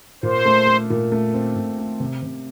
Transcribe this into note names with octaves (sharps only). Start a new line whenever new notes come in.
A#2 C5
A3
A3
A#2
A3
C4
A#2
A3
C3
C3